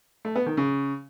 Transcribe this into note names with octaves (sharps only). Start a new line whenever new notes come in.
A3
B3
D#3
C#3